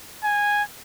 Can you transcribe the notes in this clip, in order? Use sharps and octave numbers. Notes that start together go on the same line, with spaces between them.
G#5